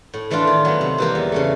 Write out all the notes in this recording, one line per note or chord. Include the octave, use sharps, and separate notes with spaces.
A2
E3 A3 D4 F4
D#3
F#3 B3
C3
E3 G3 A#3
E2
C#3 E3 A3